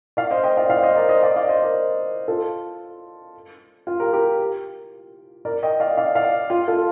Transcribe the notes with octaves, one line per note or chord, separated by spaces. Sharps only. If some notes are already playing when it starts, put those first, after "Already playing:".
D5 F5
C5 D#5
D#5 G5
D5 F5
D5 F5
C5 D#5
A#4 D5
C5 D#5
D5 F5
D5 F5
C5 D#5
A#4 D5
F4 A4
F4
G4 A#4
G4 A#4
A#4 D5
D#5 G5
D5 F5
D5 F5
D5 F5
F4
F4 A4